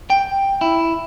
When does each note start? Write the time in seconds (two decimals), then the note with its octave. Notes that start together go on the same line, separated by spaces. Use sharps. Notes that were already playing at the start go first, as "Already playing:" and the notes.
0.10 G5
0.61 E4